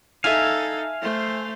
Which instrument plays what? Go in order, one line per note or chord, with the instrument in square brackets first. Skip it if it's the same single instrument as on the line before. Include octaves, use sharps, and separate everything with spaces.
[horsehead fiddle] D#4 A4 [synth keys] E5 G#5 [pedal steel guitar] F5
[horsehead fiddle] A3 C5